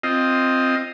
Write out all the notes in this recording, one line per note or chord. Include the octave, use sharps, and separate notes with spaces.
C4 F4 D#5